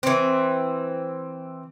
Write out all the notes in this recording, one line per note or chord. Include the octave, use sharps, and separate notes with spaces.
E3 C4